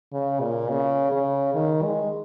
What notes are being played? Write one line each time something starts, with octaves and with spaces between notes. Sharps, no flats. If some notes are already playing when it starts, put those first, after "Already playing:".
C#3
A#2
C#3
C#3
D#3
G#3